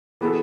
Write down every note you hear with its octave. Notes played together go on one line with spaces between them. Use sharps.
E3 B3 F#4 G#4 A4